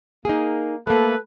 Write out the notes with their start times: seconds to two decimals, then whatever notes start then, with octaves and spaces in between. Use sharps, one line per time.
0.25 A#3 D#4 G#4
0.87 A3 A#3 A4 B4